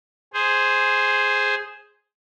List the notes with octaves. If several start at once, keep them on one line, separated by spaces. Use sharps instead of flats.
G#4 C5